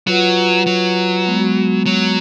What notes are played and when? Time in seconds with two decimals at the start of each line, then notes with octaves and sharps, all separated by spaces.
0.07 F#3 F4 B4 F#5
0.67 F#3
1.26 G#3 B3 F#4
1.86 F#3